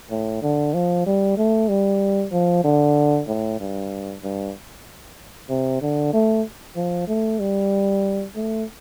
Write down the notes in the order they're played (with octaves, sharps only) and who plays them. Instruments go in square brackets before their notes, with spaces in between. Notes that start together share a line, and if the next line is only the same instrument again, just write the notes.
[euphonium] A2
D3
F3
G3
A3
G3
F3
D3
A2
G2
G2
C3
D3
A3
F3
A3
G3
A3